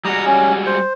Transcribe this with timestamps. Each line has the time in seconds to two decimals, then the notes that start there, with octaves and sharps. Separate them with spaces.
0.05 G3 G#3 F#4 A#5 D#6
0.26 C#4
0.66 C5